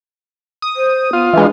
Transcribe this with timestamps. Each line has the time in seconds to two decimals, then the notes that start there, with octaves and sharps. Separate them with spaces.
0.62 D#6
0.76 C5
1.13 B3 F4
1.34 E3 G#3 D4